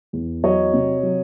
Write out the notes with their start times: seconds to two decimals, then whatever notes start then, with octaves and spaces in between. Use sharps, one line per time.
0.13 E2
0.44 F#3 C#5 D#5
0.73 C3
1.03 F#3